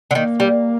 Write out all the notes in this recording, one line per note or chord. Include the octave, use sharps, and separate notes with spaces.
D3
D#3 A#3
G3